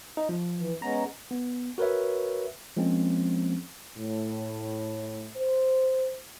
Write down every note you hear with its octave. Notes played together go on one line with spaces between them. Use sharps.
D#4
F3
E3
G#3 B3 C#4 A#5
B3
F#4 A#4 B4 C#5 E5
F3 G#3 A#3 C4 C#4
A2
C5